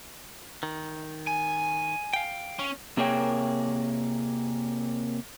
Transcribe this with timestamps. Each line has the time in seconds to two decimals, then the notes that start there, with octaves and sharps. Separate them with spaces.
0.63 D#3
1.27 G#5
2.14 F5 G5
2.59 C#4
2.97 C3 A#3 G#4 A#4 C#5 G5